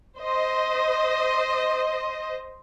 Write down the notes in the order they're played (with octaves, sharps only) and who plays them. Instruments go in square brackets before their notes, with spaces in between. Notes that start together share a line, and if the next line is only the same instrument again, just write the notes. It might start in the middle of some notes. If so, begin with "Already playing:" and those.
[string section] C5 D#5